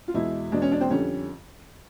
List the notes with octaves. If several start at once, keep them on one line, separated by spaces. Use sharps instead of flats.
F4
E2 B2 G#3 E4
E2 B2 G#3 D4
C#4
D4
C4
F2 D3 G3 C#4